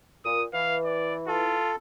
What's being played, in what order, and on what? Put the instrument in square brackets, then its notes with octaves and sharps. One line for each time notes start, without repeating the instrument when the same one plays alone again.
[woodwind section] A#2 [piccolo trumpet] D#6
[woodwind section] E3 [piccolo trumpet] F5
[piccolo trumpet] D5
[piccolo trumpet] F4 [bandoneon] A4